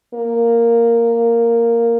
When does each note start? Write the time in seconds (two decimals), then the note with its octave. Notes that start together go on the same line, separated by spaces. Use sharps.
0.14 A#3